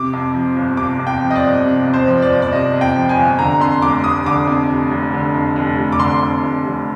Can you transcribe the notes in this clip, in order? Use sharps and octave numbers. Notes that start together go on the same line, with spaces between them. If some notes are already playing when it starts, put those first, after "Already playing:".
Already playing: C3 D6
F2
F3
G1
C3 D6
F2
G5
F3
D#5
D5
G1
C3
F2
C5
F3
D5
G1
D5
C3 D#5
F2
G5
F3
G#5
G1
D3 A#5
F2 C6
F1 D6
F1 D#6
D3 D6
F2
F1
F1
D3
F2
F1
F1
D6
D3 C6
F2
F1
F1